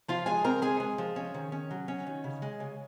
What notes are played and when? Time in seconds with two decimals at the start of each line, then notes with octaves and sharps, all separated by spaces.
0.08 F3 F4 F5
0.26 G#3 G#4 G#5
0.44 C4 A#4 A#5
0.62 G#3 G#4 G#5
0.80 G#3
0.98 F3
1.16 C#4
1.34 D#3
1.52 C#4
1.71 F#3
1.88 C#4
2.07 D#3
2.24 C#3
2.42 G#3
2.60 C#3